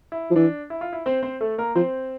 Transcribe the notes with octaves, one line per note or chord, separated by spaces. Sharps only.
E4
F3
E3 D4
E4
F4
E4
C4 C5
C4 C5
A3 A4
A#3 A#4
F3 C4 C5